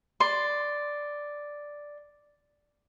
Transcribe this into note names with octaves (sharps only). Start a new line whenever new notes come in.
D5 C6